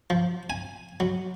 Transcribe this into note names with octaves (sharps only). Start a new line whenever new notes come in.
F3
G#5
F#3